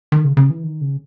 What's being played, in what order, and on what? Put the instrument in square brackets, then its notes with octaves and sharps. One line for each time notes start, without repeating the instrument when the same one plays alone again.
[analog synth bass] D#3
C#3
C#3
E3
D#3
C#3